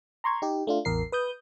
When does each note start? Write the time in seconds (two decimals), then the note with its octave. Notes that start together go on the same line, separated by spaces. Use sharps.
0.24 A#5 C6 C#6 G#6
0.42 D#4 G4
0.67 A3 D4 F4
0.85 A1 E2 A#4 C7
1.12 B4 D#6 G6